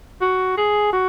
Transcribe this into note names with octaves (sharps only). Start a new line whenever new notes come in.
F#4
G#4
F#4